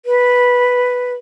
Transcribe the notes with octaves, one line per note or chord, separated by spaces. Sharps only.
B4